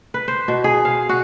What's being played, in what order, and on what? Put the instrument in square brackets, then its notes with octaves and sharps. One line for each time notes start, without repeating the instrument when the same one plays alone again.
[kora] B4
C5
B2
G#4
F5
F#4